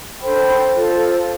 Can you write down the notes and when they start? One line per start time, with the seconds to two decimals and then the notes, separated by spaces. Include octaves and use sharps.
0.21 D4 A4 C5 G5 B5
0.73 F4 A4 C5